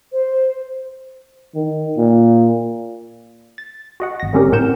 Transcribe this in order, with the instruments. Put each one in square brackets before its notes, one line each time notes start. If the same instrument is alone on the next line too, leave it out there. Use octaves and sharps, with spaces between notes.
[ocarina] C5
[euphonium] D#3
A#2
[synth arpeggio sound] A6
F#4 D#5 F#5
G#1 A#6
D3 G3 C4 C#4 G4 A#4
A2 C4 A#4 F#5 G6 E7